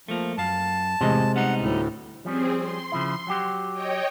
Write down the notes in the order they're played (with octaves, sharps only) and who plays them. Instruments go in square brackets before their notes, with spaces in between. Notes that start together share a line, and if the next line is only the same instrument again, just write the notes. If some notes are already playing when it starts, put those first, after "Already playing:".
[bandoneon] F3 [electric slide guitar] A3 A#3
[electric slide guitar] F#2 F5 [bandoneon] A5
[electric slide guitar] E2 A2 D#5 [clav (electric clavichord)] C3 G#3
[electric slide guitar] G3 B3 D#4 [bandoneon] F#5
[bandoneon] D2 A2
[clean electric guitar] F3 G3 C#4 [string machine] C4 G#4
[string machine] C6
[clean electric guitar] C#3 F3 E4
F#3 F#4 G4
[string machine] C#5 D#5 G5